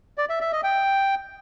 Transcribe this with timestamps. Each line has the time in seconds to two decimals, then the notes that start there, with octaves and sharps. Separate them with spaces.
0.18 D5
0.29 E5
0.41 E5
0.52 D#5
0.64 G5